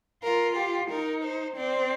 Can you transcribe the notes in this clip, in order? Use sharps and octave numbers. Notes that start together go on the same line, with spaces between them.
F4 A#4
G4
D#4 A#4
C5
C4 D5